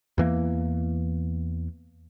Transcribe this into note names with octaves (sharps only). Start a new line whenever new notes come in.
E2 E3 A#3